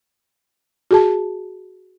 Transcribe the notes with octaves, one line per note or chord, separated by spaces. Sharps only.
F#4 G#4 A5